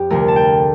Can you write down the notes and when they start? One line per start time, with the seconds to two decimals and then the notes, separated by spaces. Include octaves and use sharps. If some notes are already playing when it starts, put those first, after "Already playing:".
Already playing: F2 G4 C5
0.10 D2 C3 F3 A3 A#4
0.28 A5
0.36 G5